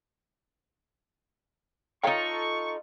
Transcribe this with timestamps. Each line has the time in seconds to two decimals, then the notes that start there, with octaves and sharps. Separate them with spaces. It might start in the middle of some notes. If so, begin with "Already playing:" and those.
2.03 D#4 F4 A4 C#5 F5 G5 C#6